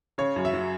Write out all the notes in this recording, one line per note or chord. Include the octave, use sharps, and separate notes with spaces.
C#3 C#5
F#2
E5
F#3